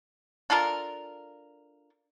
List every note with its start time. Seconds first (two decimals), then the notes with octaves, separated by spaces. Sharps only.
0.50 D4 F4 A4 A#4